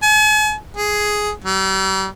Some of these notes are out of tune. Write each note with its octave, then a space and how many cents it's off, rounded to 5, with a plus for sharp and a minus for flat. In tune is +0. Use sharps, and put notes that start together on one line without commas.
G#5 +45
G#4 +5
G3 -40